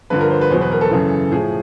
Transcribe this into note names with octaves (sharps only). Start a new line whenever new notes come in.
G2 D3 F3 B4
A#4
C5
B4
E2 B2 F#3 C5
B4
A#4
A4
F#2 C#3 E3
A2 F3 G#4